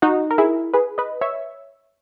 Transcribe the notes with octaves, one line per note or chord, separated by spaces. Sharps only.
D#4 F#4
A#4
E4 G#4
G#4 B4
B4 D#5
C#5 E5